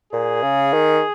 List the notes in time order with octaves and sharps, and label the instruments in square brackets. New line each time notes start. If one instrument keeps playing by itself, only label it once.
[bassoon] A#2 [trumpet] G#4
[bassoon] C#3
D#3